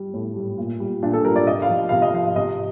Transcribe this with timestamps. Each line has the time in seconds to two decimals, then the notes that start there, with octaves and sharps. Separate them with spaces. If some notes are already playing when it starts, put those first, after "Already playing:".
Already playing: G3
0.14 A2
0.36 G3
0.58 A#2
0.80 G3
1.03 A#2 D4
1.13 A4
1.25 G3 A#4
1.36 D5
1.47 C3 D#5
1.62 F5
1.69 F3
1.89 C3 F5
2.02 D#5
2.14 F3 F5
2.36 C3 D#5